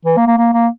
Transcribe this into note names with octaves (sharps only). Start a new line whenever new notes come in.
E3
A#3
A#3
A#3
A#3